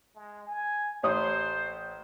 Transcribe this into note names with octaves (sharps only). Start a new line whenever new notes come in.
G#3
G#5
A1 C5 C#5 D#6